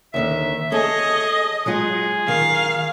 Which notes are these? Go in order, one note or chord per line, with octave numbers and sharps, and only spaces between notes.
D#2 D3 D#3 E5
G#4 A4 C#5 D#5
F#3 G#3 F4 G#4
D#3 F5